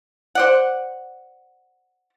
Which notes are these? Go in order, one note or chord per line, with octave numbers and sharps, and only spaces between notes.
C5 D5 F#5